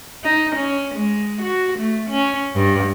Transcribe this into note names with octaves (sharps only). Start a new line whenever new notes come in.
D#4
C#4
G#3
F#4
A3
C#4
G2